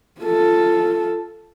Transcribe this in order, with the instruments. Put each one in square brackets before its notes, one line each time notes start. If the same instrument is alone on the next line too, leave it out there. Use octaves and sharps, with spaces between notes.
[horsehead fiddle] F4 A4